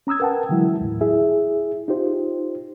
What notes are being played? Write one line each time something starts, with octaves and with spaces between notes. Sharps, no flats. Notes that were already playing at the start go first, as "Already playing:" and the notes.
C#4 A#5 D#6 E6 G#6
A#4 B4 F#5 G5 A5
D3 E3 F#3 G#3 E4
D#2 A2
E4 G#4 E5
D#4 F4 G4 C5